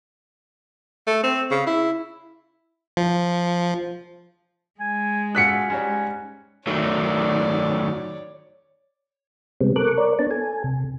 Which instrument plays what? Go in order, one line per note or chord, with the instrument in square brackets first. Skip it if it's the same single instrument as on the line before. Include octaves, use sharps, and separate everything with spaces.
[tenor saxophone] A3
C4
C#3
E4
[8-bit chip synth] F3
[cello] G#3 [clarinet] G#5
[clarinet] C#4 [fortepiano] F4 F#4 A4 [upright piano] F#6 B6 C#7
[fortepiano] G#2 G3 C#5 [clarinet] C#4
[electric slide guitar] D#3 F#3 A3 [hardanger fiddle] C#5 D5
[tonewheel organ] C3 G3 G#3 B3 C4
A4 A#4 C#6 D6 F#6
A#4 C#5 D5
B3 D4 C#5 A5
A4 G#5
C3